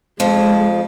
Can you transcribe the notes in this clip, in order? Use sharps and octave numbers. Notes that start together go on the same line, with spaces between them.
F2 F3 G#3